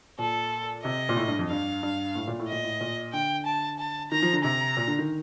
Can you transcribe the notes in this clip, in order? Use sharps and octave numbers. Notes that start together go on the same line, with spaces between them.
A#2 A4
C3 D#5
A#2
A2
G2
F2
G2 F5
G2
A2
A#2
A2
A#2 D#5
A2
A#2
D3 G5
A5
A5
D#3 A#5
F3
D3
C3 A#5
A#2
D3
D#3